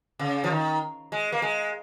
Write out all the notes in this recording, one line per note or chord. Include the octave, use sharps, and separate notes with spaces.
C#3
F3
D#3
G#3
A#3
G#3